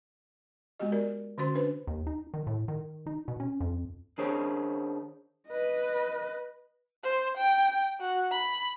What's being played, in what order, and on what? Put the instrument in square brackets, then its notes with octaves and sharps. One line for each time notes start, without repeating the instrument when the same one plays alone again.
[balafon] G#3 B3 F#4 G4 D#5
A#4 D5
D3 C#4 F#4 C5 C6
D4 B4 C5
[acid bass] D#2
D#4
D#3
A2
D#3
D#4
B2
C#4
F2
[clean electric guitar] D#3 D4 G#4 C5 C#5
[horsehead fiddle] B4 D#5
[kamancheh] C5
G5
F#4
B5